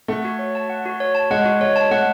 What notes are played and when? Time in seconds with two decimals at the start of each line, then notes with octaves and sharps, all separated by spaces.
0.08 A3 F#5
0.25 F#4
0.39 C#5
0.55 A5
0.70 F#5
0.85 F#4
1.00 C#5
1.15 A5
1.30 G#3 F#5
1.46 F#4
1.61 G#3 C#5
1.76 A5
1.91 A3 F#5